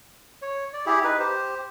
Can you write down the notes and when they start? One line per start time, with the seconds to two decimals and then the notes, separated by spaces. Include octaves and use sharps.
0.42 C#5
0.73 D5
0.86 E4 G4 G#4
1.04 D#4 B4
1.19 G4 C5